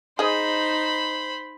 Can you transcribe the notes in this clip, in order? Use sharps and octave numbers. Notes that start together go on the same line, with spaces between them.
D#4 G#4 C5 D#5 B5